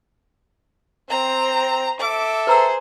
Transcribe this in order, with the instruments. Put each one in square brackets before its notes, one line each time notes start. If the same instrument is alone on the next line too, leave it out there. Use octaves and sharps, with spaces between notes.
[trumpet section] C4 [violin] C5 A#5
[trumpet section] A4 E5 [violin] D6
[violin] G#4 C5 [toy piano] B4 A#5 E6